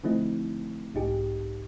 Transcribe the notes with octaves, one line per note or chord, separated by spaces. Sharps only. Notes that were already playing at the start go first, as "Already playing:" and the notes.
D3 F3 A3 C4 D#4 E4
B1 G#2 D#4 G4 G#4